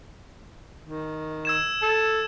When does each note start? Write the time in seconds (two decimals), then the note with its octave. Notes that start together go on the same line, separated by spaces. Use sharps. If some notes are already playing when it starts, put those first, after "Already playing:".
0.85 D#3
1.45 E6 G#6 E7
1.82 A4